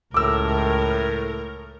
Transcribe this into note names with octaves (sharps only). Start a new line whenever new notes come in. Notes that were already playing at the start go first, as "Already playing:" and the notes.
C#2 A2 A#4 D6 E6